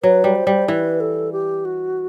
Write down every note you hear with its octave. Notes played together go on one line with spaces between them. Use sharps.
F#3 B4
G3
C5
G3
E3 B4
A4
G4
F#4